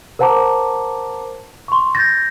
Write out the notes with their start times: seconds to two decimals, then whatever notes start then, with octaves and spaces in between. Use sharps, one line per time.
0.19 A#4 C5 F#5 A5 A#5 D6
1.68 C6 C#6
1.95 G6 A6 A#6